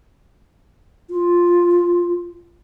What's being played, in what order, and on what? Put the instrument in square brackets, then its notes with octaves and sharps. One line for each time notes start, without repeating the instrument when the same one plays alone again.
[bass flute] F4